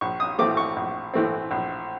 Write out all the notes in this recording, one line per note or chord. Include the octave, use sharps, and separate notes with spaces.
A#1 C#6
D#6
A2 E3 A3 C4 D6
C#6
A#1
A2 E3 A3 C4
A#1